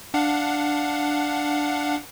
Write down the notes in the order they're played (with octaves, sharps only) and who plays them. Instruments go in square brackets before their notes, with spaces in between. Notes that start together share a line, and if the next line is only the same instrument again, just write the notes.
[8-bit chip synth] D4 F5 F#5